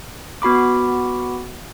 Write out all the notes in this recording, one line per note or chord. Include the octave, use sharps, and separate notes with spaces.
B3 F#4 B5 D6